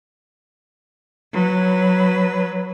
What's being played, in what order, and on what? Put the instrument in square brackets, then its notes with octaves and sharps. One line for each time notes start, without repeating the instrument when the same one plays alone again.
[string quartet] F#3 B4